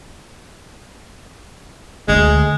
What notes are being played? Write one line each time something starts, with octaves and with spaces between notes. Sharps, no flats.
D2 G#3